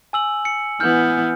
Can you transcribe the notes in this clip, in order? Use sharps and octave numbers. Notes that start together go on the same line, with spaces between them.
G#5 E6 F#7
C#7
E3 B3 F6 G6